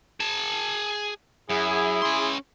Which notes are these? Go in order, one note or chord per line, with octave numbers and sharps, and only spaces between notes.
G#4 A5
F#2 E4 G#4
C#4 C6